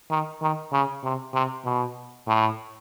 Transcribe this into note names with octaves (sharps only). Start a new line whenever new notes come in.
D#3
D#3
C#3
C3
C3
B2
A2